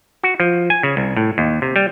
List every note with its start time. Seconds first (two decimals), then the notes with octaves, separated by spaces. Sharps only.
0.23 F#4
0.40 F3
0.70 G#5
0.83 C#3
0.97 C2
1.17 A2
1.38 D#2
1.62 C3
1.76 G3